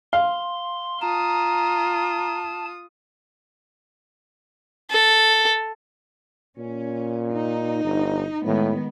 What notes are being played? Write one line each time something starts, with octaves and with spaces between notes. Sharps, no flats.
F5 C6
F4 A5 A#5 D#6
A4
A#2 C#4
D#4
G1
A2 D#3 G#3 B3